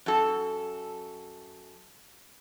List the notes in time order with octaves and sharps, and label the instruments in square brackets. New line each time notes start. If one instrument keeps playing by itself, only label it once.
[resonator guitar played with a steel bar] F#2 A4